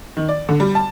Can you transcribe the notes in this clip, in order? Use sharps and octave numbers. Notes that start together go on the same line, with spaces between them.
D#3
D5
D3
G3
A5